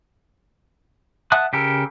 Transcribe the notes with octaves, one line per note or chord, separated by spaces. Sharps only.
E5 F#5 A5 D#6 F#6
C#3 G4 A4 A#4